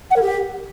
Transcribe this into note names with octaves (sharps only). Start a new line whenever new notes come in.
F#5
A#4
G4